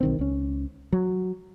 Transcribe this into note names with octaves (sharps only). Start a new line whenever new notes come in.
B1 D#3 C4
C#2 C#4
F#3